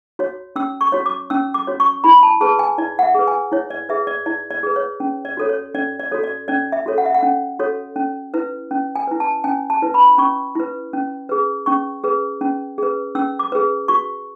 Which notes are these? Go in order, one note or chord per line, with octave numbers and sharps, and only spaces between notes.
F#4 C#5
C#4 E6
C#6
F#4 C#5
D6
C#4 E6
D6
F#4 C#5
C#6
E4 B5
A5
G#4 B4 A5
G#5
E4 D5
F#5
E5
G#4 B4
G#5
E4 C#5
D5
G#4 B4 E5
D5
E4 D5
D5
G#4 B4
C#5
C#4
D5
F#4 A4 C#5
C#5
C#4 D5
D5
F#4 A4 C#5
D5
C#4 D5
E5
F#4 A4 C#5
F#5
E5
F#5
C#4
F#4 A4 C#5
C#4
E4 B4
C#4
G#5
E4 B4
A5
C#4 G#5
A5
E4 B4
B5
C#4 C#6
E4 B4
C#4
G#4 B4
C#4 C#6
G#4 B4
C#4
G#4 B4
C#4 E6
D6
G#4 B4
F#4 C#6